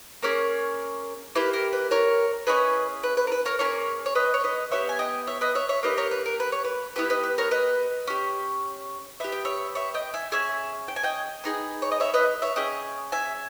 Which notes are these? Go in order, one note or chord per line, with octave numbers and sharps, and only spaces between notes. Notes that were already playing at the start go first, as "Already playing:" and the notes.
A#3 C#4 G#4 A#4 C#5
A#3 E4 G4 B4
A#4
B4
A#4 C#5
C#4 E4 G#4 B4 D#5
B4
B4
A#4
B4
A#4 C#5
A#3 C#4 G#4 A#4 C#5
C#5
B4 D#5
C#5
B4 D#5
B3 G4 C#5 E5
G#5
D#5 G5
C#5 E5
B4 D#5
C#5 E5
C#5 E5
A#3 D#4 G4 B4 D#5
A#4 C#5
B4
A#4
B4
C#5
B4
B3 E4 G4 B4
B4 D#5
B4
A#4 C#5
B4 D#5
C#4 G4
B3 G4 E5
G5
C#5 E5
C#5 E5
D#5 G5
E5 G#5
C#4 G#4 E5 G#5
G5
G#5
D#5 G5
B3 D#4 G#4
C#5
D#5
C#5 E5
B4 D#5
C#5 E5
C#4 G#4 D#5 G5
E5 G#5